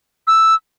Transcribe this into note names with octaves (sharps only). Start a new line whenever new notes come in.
E6